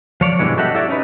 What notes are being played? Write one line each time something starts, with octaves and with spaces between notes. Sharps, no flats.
F3 C#5 D5
G2 B2 D3 E3 G#3
F#4 G4 A4 D#5 E5 F#5
E4 F#4 G4 A4 D5 E5
C#4 D#4 B4